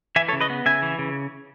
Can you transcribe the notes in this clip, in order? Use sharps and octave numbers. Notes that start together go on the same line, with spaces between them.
E3 E5 G#5
A4 C#5
C#3
B4 D#5
B3
C#3 E5 G#5
E3
C#3